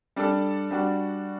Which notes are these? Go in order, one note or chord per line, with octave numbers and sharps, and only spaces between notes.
G3 D4 A4
G3 D4 F#4